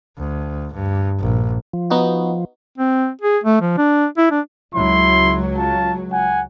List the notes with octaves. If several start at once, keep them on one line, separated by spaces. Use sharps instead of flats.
D2
G2
A#1
F3
B3 D#4 F#4
C4
G#4
A3
F3
D4
E4
D4
C#2 F#3 E4 C6
F4 A5
F#5 G#5